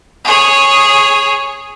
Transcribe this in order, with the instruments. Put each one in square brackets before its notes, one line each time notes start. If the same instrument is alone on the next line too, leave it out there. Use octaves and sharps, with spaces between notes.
[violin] G#4 C#5